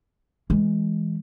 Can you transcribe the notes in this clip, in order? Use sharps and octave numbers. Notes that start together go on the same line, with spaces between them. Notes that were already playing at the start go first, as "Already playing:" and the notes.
E3 G#3